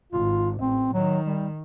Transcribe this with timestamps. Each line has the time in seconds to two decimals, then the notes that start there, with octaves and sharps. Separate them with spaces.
0.13 G#1 F4
0.61 A1 C4
0.94 D#3 F#3
1.26 G3